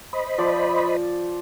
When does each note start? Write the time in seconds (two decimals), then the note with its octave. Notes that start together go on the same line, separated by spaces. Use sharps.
0.13 C5 D#5 B5
0.38 F3 D5